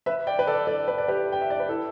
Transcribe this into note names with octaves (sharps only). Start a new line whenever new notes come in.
B4 E5
D5 G5
B4
A4 D5
A4 D5
B4
D5
G4 B4
G5
E5
D5
B4
E4 A4